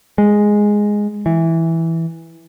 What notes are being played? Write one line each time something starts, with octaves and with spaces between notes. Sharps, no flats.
G#3
E3